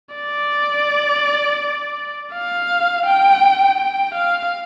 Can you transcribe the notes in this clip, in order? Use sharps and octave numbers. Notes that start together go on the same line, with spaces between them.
D5
F5
G5
G5
F5